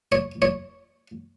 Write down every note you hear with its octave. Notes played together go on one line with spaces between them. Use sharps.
C#5
C#5